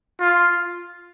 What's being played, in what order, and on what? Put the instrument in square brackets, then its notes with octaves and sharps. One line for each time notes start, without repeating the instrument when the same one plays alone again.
[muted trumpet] F4